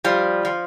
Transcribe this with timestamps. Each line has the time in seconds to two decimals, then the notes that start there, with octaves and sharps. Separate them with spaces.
0.04 F3 G3
0.45 F3